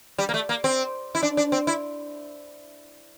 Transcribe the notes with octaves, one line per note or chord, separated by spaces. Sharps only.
G3
A#3
A3
A#3
C4
E4
D4
D4
C4
E4